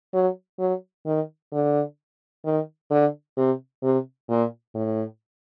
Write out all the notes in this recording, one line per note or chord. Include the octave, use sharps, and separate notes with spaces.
F#3
F#3
D#3
D3
D#3
D3
C3
C3
A#2
A2